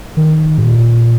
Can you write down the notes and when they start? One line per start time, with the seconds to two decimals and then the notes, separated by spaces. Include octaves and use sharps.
0.17 D#3
0.58 G#2
0.63 A#2